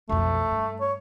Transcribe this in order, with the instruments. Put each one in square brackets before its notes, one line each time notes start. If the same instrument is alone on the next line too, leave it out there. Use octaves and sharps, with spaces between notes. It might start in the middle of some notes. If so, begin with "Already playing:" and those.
[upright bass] B1 F2 [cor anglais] A3
[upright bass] G2
[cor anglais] C#5